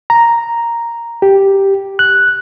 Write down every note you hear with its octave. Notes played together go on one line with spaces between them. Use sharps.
A#5
G4
F#6